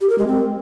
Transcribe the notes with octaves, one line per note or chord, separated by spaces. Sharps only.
G4
A#4
G#3
C4